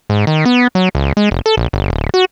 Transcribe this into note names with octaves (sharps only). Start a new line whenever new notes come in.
G#2
D#3
B3
F#3
C#2
G#3
F1
A4
A#1
G1
D1
F#4